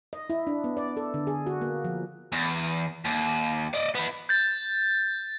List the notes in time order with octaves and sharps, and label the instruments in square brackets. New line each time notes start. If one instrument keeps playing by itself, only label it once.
[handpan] D#5
E4
D4
B3
D5
A4
D3
G#4
F#4
A#3
F3
[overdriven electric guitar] E2
D#2
D5 D#5
B3 E4
[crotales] G6 A6